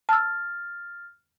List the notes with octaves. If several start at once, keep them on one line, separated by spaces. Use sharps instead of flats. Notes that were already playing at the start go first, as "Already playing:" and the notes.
A5 E6 F6 A6